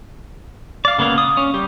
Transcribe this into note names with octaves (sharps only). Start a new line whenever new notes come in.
D5 F5
C#3 A#3 B3 G#4 F5
D#6
C#4
G3 G4